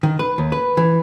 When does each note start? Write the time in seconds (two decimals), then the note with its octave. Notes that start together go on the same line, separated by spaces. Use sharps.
0.03 D#3
0.19 B4
0.38 D#2
0.52 B4
0.77 E3